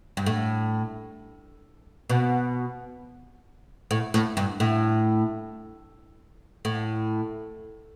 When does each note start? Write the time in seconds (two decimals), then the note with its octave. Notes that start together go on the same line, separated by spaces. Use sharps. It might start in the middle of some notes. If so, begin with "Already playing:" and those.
0.17 G2
0.26 A2
2.10 B2
3.91 A2
4.14 A2
4.37 G2
4.60 A2
6.65 A2